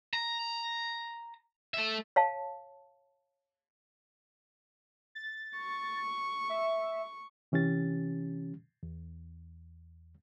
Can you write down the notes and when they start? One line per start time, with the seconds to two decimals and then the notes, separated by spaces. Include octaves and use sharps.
0.13 A#5
1.74 A3 E5
2.16 C#5 F5 A5
5.15 A6
5.57 C#6
6.49 E5
7.52 C3 E3 C#4 G4 A6
8.83 E2